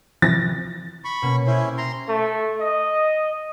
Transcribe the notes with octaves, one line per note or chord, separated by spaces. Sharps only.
C3 E3 F3 A6 A#6
B5 C#6
B2 A#3 C#4
C#4 E4 G4 C5
A#5 C6
A3
D#5